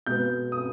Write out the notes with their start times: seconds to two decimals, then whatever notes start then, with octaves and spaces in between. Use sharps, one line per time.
0.06 B2 G#3 B3 G6
0.52 D#6